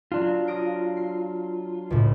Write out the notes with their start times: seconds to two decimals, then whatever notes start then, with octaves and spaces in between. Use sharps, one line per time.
0.12 F#3 D4 F4
0.48 D#6 A#6 D7
0.97 C7
1.90 C#2 A2